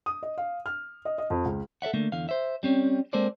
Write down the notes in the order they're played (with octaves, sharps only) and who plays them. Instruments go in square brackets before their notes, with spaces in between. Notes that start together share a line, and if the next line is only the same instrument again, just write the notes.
[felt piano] D#6
D#5
F5
F6
D#5
D#5
F2
C#2
[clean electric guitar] A4 D5 E5 F#5
D3 A3 A#3
E2 D3 F5
C5 E5
G3 C4 C#4
G#3 A#3 C4 A4 C5 D5